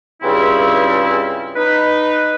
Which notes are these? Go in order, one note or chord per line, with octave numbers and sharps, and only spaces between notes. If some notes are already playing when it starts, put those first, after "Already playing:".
C#2 G2 C#3 C4 E4
D#4 B4